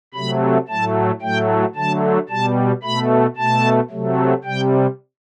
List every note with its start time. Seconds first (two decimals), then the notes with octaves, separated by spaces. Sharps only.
0.14 C3 F#3 A3 B5
0.68 A2 F#3 A3 A5
1.22 A2 F#3 A3 G5
1.75 D3 F#3 A3 A5
2.29 B2 G3 A5
2.83 B2 A3 B5
3.37 B2 A3 A5
3.90 C3 F#3 A3
4.44 C3 G3 G5